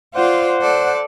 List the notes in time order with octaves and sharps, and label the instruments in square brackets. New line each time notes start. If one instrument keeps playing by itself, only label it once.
[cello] F4 D5 [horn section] C5 F#5
[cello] A4 D5